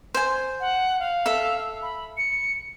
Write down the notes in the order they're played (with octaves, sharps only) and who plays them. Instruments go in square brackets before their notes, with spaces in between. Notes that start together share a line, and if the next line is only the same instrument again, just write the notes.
[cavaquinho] C5 G#5
[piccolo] F#5
F5
[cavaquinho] A4 E5
[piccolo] B5
C#7